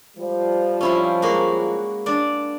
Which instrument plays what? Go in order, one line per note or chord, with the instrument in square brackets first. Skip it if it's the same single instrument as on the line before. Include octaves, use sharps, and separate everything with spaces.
[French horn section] F3 G3
[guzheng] C#4 E4 F4
G#3 A#3 F#4
D4 D5